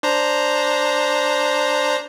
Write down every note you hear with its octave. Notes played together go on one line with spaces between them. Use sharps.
D4 C5 A#5